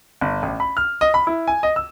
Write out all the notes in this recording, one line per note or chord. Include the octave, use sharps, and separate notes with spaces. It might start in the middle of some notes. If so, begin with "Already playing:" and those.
G1
A1
B5
F6
D#5
B5
E4
G#5
D#5
E6